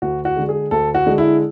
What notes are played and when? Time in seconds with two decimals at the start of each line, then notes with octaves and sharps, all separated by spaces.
0.02 D2 F#4
0.25 F#4
0.36 D3 G#3
0.49 G#4
0.71 D2 A4
0.95 F#4
1.06 D3 G#3
1.18 E4